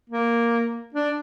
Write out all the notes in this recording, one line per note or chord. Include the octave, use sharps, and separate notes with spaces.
A#3
D4